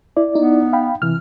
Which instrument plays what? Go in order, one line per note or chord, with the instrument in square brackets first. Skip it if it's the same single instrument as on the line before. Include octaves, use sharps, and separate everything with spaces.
[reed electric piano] E4 D5
[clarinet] B3 [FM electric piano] D#4
[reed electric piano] F5 G5 B5
[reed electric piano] C3 E3 [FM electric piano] F6